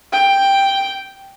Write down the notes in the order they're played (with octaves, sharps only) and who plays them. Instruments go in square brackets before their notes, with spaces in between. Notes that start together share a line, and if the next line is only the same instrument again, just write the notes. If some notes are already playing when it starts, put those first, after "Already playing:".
[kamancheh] G5